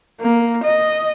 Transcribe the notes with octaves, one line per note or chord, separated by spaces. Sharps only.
A#3
D#5